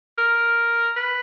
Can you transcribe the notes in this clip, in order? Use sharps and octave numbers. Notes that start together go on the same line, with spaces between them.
A#4
B4